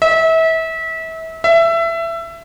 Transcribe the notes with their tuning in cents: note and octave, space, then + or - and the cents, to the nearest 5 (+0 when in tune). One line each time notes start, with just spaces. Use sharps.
E5 -30
E5 +20